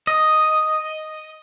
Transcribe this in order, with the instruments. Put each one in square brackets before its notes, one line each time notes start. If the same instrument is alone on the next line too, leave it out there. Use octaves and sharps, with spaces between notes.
[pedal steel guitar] D#5